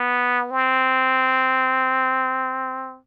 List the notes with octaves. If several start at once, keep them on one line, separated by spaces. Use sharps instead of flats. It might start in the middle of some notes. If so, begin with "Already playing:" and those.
Already playing: B3
C4